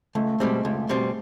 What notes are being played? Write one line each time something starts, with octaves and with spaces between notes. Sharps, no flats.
C#2 A3
B2 G3 G#3 C4
C#2 A3
B2 G3 C4